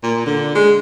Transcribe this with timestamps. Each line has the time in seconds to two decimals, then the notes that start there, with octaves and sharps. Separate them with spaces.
0.03 A#2
0.26 D3
0.55 G#3